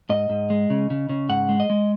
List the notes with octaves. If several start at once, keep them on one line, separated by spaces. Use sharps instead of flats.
G#2 D#5
G#2
G#3
C#3
C#3
C#3
G#2 F#5
G#3
D#5
G#3